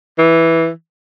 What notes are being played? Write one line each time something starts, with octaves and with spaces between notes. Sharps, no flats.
E3